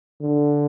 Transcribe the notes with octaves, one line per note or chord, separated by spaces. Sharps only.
D3